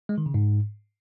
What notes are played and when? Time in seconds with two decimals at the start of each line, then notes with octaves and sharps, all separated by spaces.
0.09 G#3
0.18 D#3
0.26 C#3
0.34 G#2